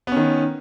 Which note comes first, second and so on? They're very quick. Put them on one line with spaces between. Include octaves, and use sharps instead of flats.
B3 C#4 D#3